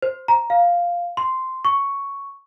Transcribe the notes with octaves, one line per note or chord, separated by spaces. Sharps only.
C5
A#5
F5
C6
C#6